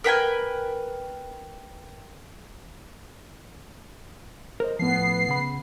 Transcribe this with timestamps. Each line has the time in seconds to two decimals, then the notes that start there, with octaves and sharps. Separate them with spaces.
0.04 A#4 B4 G5 G#5
4.60 A#4 C5 D#5
4.79 A2 F3 B3 C7
5.29 C#3 B5